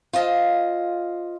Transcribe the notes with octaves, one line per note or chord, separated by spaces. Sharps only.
F4 C5 D#5 F5